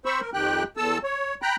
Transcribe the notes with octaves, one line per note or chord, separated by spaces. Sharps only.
C4 C5 B5 C#6 E6
A#4
F2 D#3 G4 G5 F#6
E2 A4 A5 E6
C#5
G5 A#5 B5 F#6